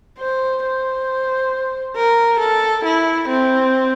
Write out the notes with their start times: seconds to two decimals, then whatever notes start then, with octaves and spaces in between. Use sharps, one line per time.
0.19 C5
0.63 C5
1.96 A#4
2.40 A4
2.85 E4
3.29 C4